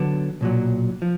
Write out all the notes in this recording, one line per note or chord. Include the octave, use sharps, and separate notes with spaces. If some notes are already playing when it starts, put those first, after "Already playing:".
Already playing: D3 F#3 B3 D4
B1 A#2 F#3
F3